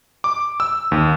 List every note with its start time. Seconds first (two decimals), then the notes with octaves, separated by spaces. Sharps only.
0.24 D6
0.60 E6
0.92 D#2